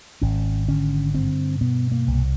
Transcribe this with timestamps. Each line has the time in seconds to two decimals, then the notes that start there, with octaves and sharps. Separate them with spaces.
0.21 G#1 C#4
0.68 D3 C#4
1.14 G2 C4
1.61 B2 B3
1.92 A#3
2.07 C2